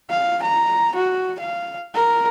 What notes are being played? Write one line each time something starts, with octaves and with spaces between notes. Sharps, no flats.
F5
A#5
F#4
F5
A#4